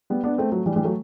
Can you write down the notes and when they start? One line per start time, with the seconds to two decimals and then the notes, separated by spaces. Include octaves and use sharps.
0.10 G3 B3
0.24 B3 D4
0.38 A3 C4
0.52 F#3 A3
0.66 E3 G3
0.76 E3 G3
0.84 F#3 A3